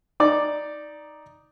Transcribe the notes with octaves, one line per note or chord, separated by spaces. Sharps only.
D#4 D5 D6